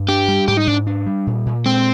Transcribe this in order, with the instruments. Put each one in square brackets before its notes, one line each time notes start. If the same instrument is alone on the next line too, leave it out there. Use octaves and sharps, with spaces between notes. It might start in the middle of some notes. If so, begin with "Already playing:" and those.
Already playing: [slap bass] G2
[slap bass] D4 [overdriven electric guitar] G4
[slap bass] G3
[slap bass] G#2 [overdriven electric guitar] G4
[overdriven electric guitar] D#4
[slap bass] G#2 [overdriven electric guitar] D4
[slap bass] D4
G3
A#2
A#2
[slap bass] G#3 [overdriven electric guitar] C4